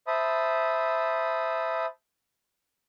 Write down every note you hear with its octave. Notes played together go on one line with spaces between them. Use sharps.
C5 E5 A5 B5 D#6